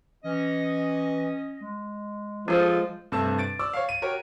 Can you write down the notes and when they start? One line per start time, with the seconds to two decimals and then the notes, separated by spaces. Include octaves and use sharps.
0.24 E3 C#4 D#5
1.61 G#3
2.48 F3 G#4 A4 C5
3.12 G2 C3 A3 A5 E6 E7
3.38 A6 D7
3.59 D5 D6 E6
3.74 C#5 F5
3.89 D#7
4.02 F#4 G4 A#4 C#5